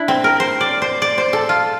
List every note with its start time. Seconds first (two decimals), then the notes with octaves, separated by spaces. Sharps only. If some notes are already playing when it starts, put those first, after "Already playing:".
Already playing: D4 E4
0.08 C4
0.24 A#4
0.40 C5
0.61 D5
0.82 C5
1.02 D5
1.18 C5
1.33 A4
1.49 F4